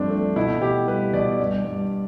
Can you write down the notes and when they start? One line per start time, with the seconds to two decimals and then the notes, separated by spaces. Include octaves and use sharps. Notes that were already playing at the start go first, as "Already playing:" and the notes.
Already playing: G2 F3 A3 C4 D4
0.10 A3
0.36 B2 E4
0.61 B2 G4
0.87 G3 B4
1.13 B2 D5
1.39 G2
1.65 G2